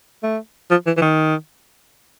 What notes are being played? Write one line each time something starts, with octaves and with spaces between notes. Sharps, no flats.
A3
F3
E3
E3
D#3